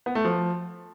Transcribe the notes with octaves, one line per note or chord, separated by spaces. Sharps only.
B3
A3
F3